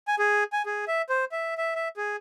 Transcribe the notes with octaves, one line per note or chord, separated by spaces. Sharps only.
G#5
G#4
G#5
G#4
E5
C5
E5
E5
E5
G#4